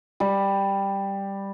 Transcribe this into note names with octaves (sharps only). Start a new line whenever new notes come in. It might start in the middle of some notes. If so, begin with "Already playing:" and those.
G3